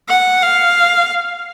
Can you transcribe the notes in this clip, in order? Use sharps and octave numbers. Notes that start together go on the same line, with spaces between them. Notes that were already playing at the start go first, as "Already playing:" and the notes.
F#5
F5